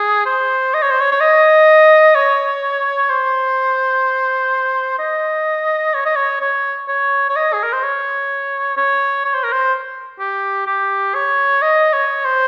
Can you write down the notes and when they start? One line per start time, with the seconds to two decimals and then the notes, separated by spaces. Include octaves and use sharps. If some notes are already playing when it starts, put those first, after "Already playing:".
Already playing: G#4
0.26 C5
0.74 D#5
0.82 C#5
0.90 C5
1.00 C#5
1.11 C#5
1.20 D#5
2.15 C#5
3.10 C5
4.99 D#5
5.94 C#5
6.05 D#5
6.16 C#5
6.40 C#5
6.88 C#5
7.29 C#5
7.36 D#5
7.53 G#4
7.63 A#4
7.73 C5
7.83 C#5
8.77 C#5
9.25 C#5
9.34 C5
9.44 A#4
9.52 C5
10.20 G4
10.67 G4
11.15 C#5
11.62 D#5
11.93 C#5
12.25 C5